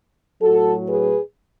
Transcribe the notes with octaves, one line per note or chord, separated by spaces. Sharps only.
A2 F#3 F#4 A4
G#4 B4